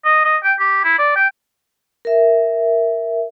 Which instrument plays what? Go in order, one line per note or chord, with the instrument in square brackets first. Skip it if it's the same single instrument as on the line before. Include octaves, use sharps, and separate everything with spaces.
[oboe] D#5
D#5
G5
G4
E4
D5
G5
[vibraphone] A#4 E5